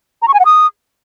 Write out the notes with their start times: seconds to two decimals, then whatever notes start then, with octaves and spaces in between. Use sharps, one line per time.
0.22 A#5
0.28 C#6
0.34 G#5
0.40 F#5
0.45 D#6